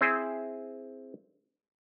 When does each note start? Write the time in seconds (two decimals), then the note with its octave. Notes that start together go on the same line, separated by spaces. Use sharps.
0.01 C4 E4 G#4 C5